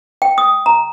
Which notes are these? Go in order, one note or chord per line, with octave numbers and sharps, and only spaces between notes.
G5
D#6
A#5